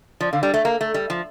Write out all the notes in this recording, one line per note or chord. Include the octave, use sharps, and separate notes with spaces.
F3 D5
D3 F5
G3 D5
A3 E5
A#3
A3
G3
F3